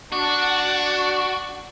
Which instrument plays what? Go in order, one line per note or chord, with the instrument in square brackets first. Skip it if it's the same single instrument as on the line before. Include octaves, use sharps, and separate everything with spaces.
[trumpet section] D4 [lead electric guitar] F#4